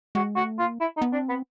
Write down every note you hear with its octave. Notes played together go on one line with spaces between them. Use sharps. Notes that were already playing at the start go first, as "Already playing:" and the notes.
G#3 F#4
A3 F#4
A#3 F4
E4
D#4
B3
C4 D4
B3